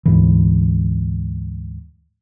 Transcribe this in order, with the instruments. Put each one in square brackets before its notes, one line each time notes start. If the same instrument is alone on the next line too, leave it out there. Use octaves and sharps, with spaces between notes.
[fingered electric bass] D2 G#2 E3